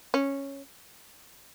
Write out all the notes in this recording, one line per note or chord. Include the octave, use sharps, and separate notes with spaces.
C#4